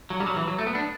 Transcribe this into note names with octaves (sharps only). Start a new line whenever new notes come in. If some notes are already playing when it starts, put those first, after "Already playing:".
F#3
G3
F#3
E3
F#3
A3
B3
D4